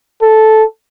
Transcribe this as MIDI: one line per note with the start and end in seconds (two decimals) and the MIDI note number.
0.22 0.63 69